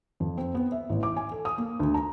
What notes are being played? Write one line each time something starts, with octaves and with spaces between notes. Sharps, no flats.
F2
C4
B3
E5
A1
D6
G#5
A4
D#6
A#3
D2
A#5